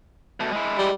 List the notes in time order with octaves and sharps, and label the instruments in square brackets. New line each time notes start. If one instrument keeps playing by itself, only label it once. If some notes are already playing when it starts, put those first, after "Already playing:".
[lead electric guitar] B2 A3
G#3 E4
[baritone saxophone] G3